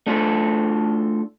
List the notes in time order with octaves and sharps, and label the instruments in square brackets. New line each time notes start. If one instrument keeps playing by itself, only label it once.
[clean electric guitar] A3 D4 F4 A4